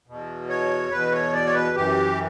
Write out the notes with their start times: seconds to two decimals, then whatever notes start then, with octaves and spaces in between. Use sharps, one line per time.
0.07 E2 B2
0.49 C#5
0.91 E2 B2 B4
1.12 C#5
1.33 D5
1.46 C#5
1.54 B4
1.75 F#2 E3 G4